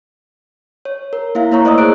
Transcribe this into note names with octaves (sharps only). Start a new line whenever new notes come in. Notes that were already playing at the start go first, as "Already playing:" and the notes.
C#5
A#4
A#3 E4 E5 F5
A#3 E4 C#5 A#5 C#6
A3 C5 D5 D#5 D#6 E6
G#4 D6 F#6 D7